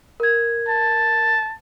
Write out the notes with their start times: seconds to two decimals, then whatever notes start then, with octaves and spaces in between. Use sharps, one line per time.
0.20 A#4 G#6
0.68 A5